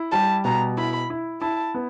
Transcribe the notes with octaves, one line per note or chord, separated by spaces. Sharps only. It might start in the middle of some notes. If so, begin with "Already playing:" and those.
Already playing: E4
G3 A5
B2 A#5
E4 B5
E4
E4 A5
B3